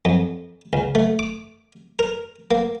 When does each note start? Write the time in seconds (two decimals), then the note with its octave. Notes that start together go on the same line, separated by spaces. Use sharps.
0.05 F2
0.73 C#2
0.95 A3
1.19 D6
1.99 A#4
2.51 A#3